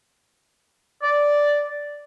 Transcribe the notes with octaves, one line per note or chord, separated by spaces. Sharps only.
D5